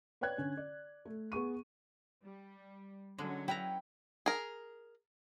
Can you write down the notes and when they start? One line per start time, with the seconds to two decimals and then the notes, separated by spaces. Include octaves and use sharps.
0.21 B4 C#5 D5 G5 F#6 G#6
0.38 D3 C#4
0.57 D5
1.05 A3
1.32 B3 G#4 C#6 D#7
2.23 G3
3.18 D3 F#3 G#3 C#4
3.48 E4 B4 G5 A#5
4.26 G#4 A#4